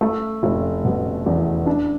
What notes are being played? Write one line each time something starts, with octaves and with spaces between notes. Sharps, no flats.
A3
F1
B2
E2
D4